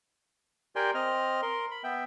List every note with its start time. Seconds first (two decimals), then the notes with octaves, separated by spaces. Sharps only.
0.76 G4 A#4 D5 G5 G#5 C6
0.95 C4 D#5 F6
1.42 A#4 C6
1.71 B5
1.84 B3 E5 G5